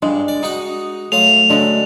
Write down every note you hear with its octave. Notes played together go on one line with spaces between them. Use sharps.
G2 G#3 D4
D5
D#4 F#4 F#5 D#6
F#3 A3 F4 D#6 F7
D3 F#3 G#3